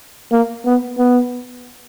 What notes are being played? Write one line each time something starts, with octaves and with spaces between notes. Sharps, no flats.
A#3
B3
B3